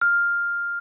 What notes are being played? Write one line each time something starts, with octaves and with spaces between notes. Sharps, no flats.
F6